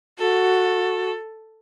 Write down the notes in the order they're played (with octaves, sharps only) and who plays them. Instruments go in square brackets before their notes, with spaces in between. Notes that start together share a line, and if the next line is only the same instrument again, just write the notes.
[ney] F#4 [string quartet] A4